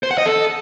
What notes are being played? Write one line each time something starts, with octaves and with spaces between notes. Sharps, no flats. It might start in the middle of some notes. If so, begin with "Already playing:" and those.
C5
F#5
D#5
A4